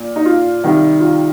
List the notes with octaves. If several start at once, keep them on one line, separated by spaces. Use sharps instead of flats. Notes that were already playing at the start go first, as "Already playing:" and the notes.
Already playing: A#2
D#4
F4
C3 D#3 G3
F4